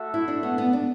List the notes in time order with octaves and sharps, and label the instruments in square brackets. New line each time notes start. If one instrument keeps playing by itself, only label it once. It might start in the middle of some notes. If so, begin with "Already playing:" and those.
Already playing: [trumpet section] A3 F#4 A4 E5
[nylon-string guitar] E4
D4
B3
B3
D4